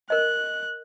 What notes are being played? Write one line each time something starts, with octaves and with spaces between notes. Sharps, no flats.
A#4 D#5 F#6